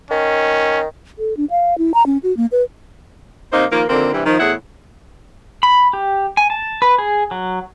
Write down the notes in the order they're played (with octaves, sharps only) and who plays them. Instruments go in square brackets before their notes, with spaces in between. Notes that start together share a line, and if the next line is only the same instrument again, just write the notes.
[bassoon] D#3 [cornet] C#4
[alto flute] A4
D4
F5
E4
A#5
C#4
F#4
A#3
B4
[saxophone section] C3 A#3 D#4 C5
D#3 F3 A#3
F2 D3 D#3 A#3 C4
G2 C3 E3 G3
D#3 F3
E2 A2 E4 G#4 F#5
[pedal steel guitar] B5
G4
G#5
A5
B4
G#4
F#3